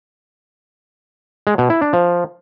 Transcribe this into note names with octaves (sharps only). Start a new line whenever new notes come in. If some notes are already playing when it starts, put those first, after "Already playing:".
G#3
B2
E4
D4
F3